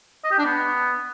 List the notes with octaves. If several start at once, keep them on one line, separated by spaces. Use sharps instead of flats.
D#5
G4
D4
B3